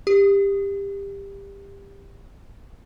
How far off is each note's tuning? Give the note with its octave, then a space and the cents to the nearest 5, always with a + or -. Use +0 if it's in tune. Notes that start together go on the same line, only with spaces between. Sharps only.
G4 +20